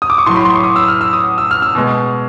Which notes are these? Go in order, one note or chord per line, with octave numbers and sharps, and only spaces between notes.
D#6
D6
C#6
A2 F#3 C6
B5
C6
C#6
D#6
E6
F6
E6
D#6
E6
F6
E6
B2 G#3